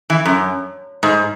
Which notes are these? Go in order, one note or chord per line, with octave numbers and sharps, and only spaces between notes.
E3
F#2
G#2